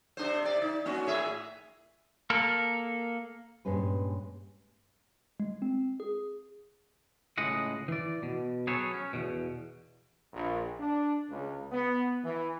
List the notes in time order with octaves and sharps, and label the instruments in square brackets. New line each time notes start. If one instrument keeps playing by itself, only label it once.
[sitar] C3 D4 C5
C3 D5
D#4
A#3 C#4 F#4
A2 G#4 E5
[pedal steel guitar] A#3 A4 A#4
[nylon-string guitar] G2 A#2 G#3 C#4 B4
[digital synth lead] G#3
C4
G#4
[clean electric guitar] C#2 A2 G#3 D#5 F#5
E3 D5
B2
F#3 G#4 A4 B4 C#5
C#4
E2 B2
[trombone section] A#1
D4
C#2
B3
E3